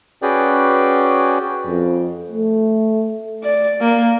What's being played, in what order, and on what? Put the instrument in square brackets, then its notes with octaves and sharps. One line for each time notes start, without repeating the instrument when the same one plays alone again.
[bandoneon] C#4 F#4 G#4 B4 D5 G5
[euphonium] F2
A3
[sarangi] D5
A#3